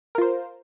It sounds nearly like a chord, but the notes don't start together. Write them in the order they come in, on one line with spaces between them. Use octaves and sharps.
A#4 F4 C5